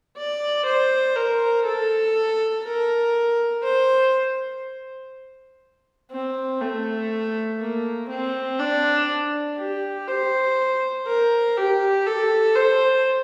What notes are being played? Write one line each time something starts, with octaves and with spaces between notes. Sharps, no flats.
D5
C5
A#4
A4
A#4
C5
C4
A3
A#3
C4
D4
G4
C5
A#4
G4
A4
C5